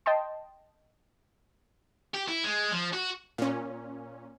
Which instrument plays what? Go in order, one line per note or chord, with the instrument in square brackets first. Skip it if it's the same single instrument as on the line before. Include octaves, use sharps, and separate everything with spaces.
[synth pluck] D#5 G5 A5 C6
[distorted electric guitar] G4
E4
G#3
F3
F#4
[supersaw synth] A#2 C#4